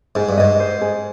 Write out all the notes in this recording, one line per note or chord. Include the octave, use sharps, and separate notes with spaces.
G#2 G#4
G2
G#2 D#5
C5
G#4